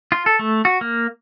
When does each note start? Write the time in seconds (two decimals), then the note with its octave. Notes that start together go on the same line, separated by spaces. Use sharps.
0.12 F4
0.26 A4
0.39 A3
0.65 F#4
0.81 A#3